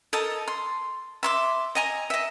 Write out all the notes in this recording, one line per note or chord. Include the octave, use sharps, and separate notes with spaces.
A4 A#4 D#5 A5
C6
E5 C6 D6
D#5 G#5 A#5
D#5 E5